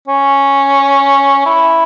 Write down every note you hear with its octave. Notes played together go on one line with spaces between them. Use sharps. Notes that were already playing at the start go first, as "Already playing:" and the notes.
C#4
E4